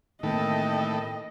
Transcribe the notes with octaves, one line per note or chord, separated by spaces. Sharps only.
A2 D#3 E3 A3 A#3 C4 D#5 G5